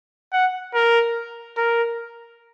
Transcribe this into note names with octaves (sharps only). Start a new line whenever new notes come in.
F#5
A#4
A#4